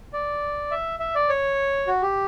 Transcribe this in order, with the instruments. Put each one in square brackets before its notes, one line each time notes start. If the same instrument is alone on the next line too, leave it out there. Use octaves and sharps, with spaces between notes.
[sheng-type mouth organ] D5
E5
E5
D5
C#5
F#4
G4